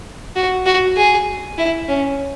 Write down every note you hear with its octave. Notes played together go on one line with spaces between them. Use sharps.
F#4
F#4
G#4
E4
C#4